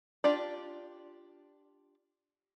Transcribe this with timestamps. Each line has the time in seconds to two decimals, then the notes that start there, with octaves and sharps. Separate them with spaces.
0.24 D4 F4 G4 D5